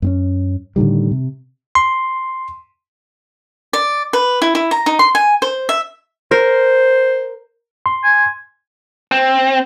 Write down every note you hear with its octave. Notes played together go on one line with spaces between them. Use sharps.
F#2 C4 C#4
A2 D3 D#3 G3
C3
C6
D5
B4
E4
E4
A#5
D#4
C6
G#5
C5
E5
A#4 C5
C6
G#5
C4